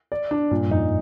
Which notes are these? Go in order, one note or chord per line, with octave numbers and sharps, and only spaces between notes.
D5
D4
G2 A#2
F2 D#4